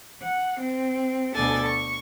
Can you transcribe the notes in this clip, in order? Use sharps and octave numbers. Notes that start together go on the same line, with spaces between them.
F#5
C4
D2 B2 A4 D5 G#5 A6
C#6